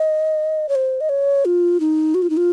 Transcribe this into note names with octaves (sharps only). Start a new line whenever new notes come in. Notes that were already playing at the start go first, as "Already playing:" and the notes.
Already playing: D#5
C#5
C5
D#5
C#5
F4
D#4
F#4
F4
D#4
F4